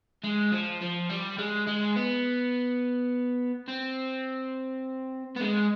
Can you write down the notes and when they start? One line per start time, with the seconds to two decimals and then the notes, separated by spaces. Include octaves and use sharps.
0.24 G#3
0.52 F3
0.82 F3
1.10 G3
1.38 G#3
1.67 G#3
1.96 B3
3.68 C4
5.36 B3
5.41 G#3